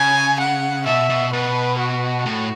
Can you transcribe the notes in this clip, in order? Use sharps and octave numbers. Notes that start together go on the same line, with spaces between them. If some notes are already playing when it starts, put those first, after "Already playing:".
Already playing: C#3 G#5
F#5
B2 E5
B2
B2 B4
F#4
A2